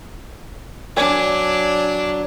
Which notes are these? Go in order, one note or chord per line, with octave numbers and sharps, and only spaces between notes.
F#3 D4 D5 G#5